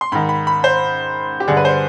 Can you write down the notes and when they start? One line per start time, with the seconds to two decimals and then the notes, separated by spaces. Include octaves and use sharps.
0.01 C6
0.12 G#2 D#3 B5
0.29 B5
0.47 B5
0.64 C5
1.40 G4
1.48 G2 D3 G#4
1.57 B4
1.65 C5